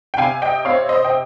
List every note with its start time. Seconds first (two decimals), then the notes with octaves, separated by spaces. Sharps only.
0.14 G5
0.18 C3 F5 G#5
0.42 D#5 G5
0.65 C4 C#5 F5
0.89 C5 D#5
1.04 G5